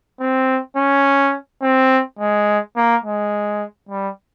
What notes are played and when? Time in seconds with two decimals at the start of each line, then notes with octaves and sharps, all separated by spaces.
0.20 C4
0.77 C#4
1.62 C4
2.19 G#3
2.76 A#3
3.04 G#3
3.89 G3